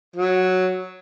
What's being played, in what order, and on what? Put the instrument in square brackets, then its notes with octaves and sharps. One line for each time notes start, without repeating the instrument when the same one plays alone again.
[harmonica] F#3